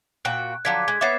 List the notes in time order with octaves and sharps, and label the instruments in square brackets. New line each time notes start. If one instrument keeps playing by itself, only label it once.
[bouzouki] A#2 F#4 G5 [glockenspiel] F#6
[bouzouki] D3 F3 F#3 [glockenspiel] G#6 B6
[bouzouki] G#3 [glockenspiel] G#6
[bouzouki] B3 C#4 E5 [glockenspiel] D6 A6 C7